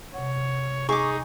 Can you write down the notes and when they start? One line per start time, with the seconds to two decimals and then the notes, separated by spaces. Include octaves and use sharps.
0.14 C3 C#5 F#5
0.89 D#4 G#4 C#6 D6